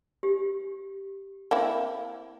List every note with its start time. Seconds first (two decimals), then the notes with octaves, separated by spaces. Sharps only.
0.23 G4
1.51 A#3 C4 E4